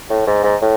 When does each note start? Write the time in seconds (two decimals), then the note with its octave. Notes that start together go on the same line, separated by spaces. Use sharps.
0.10 A2
0.27 G#2
0.43 G#2
0.61 A2